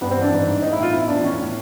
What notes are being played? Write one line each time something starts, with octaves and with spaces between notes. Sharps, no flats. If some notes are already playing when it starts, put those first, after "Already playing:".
G2 B3
C4
E3
D4
G#2
G#2
A2 D#4
E4
A2 F4
E2 E4
E2 D4
A2 C#4
A2